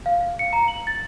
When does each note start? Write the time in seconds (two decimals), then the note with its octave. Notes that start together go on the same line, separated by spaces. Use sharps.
0.06 F5
0.21 F5
0.39 C#7
0.53 A#5
0.68 F#7
0.87 A6